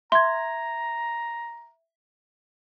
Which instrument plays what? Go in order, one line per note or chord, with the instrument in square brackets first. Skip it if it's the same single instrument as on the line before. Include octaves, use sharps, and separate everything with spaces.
[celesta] E5 G#6 [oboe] A#5 [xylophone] C6